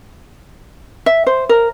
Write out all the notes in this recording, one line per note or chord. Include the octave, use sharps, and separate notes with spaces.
E5
C5
A#4